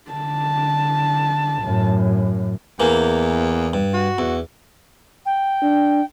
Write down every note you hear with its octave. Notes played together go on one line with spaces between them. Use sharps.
D3 A5
F#2 A2
E2 E3 A#3
G2
F#4
E2
G5
D4